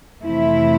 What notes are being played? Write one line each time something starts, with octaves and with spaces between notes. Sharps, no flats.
F2 C3 E3 A3 C4 E4